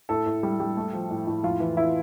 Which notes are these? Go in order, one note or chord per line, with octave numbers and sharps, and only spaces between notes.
A2 A4
A2
G3
G3
A3
F3
A2
A2
F2 F4
E3
E3 E4